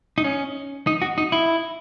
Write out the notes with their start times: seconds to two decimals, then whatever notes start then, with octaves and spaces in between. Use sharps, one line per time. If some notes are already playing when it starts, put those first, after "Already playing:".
0.18 D#4
0.24 C#4
0.87 D#4
1.02 F#4
1.18 D#4
1.32 E4